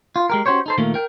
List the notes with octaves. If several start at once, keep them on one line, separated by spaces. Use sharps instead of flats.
F4
G#3 G4 A#4
C#4 F#4 G4 C5 C#5
D#4 A4 C5
A#2 D#3 A3 A#3
A#4 G5